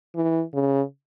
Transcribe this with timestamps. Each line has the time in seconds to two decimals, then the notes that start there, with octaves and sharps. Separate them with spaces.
0.15 E3
0.54 C#3